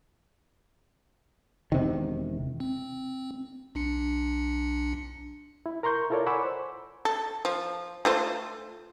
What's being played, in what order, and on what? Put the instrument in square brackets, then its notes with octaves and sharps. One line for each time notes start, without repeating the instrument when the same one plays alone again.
[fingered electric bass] E1 C3 D#3
[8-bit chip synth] C4
B1 D4 C#7
[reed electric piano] E4
A#4 A#5 C6 C#6 G6
E4 F4 A4 A#4 C#5 D5
F#5 G#5 B5 C#6 D6 E6
C5
[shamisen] A4
F3
A3 F4 C5